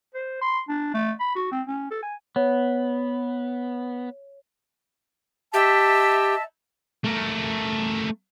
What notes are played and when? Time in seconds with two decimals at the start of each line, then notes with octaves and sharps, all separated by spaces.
0.15 C5
0.41 C6
0.69 D4
0.94 A3
1.20 B5
1.35 F#4
1.51 C4
1.67 C#4
1.91 A4
2.03 G#5
2.36 B3 C#5
5.54 G4 D#5 E5 A5
7.04 A3 A#4